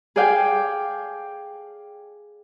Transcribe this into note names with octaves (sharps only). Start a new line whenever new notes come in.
G#4 A4 D5 F5 G5 G#5